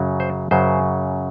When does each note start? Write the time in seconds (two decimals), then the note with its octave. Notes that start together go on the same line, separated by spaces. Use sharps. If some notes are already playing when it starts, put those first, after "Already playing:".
Already playing: F#2 C#3 F#3
0.20 C5
0.51 F#2 C#3 F#3 C5